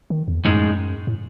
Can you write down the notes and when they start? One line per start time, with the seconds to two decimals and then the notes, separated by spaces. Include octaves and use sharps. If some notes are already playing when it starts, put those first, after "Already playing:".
0.10 D#3
0.28 E2
0.45 F#2 A2 G#3 D#4
1.07 A2